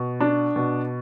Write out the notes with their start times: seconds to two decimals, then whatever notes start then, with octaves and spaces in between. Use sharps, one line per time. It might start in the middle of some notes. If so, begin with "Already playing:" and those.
Already playing: B2
0.20 D4
0.56 B2